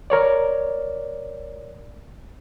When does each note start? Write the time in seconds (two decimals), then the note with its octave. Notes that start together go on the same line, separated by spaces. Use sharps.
0.10 A#4 C#5 D5